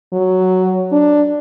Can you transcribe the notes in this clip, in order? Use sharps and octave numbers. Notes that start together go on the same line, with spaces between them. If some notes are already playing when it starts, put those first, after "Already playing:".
F#3
D4